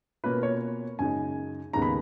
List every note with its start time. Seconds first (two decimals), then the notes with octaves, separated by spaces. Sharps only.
0.24 B2 A#3 C#4 F4 B4
0.43 C#5
0.99 F#2 C#3 G#3 D#4 G#5
1.73 D#2 C#3 G#3 B3 D#4 A#5
1.82 B5